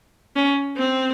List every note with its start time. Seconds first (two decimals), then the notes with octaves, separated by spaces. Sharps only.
0.36 C#4
0.77 C4